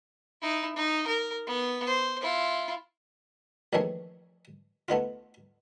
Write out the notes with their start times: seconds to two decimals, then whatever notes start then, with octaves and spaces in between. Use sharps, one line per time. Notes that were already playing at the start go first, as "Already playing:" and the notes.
0.41 D#4 E4
0.76 D#4
1.07 A#4
1.47 B3
1.86 C5
2.21 E4 F4
3.73 A#1 E2 D#3 A3 G#4 C#5
4.88 A3 B3 D#4 F4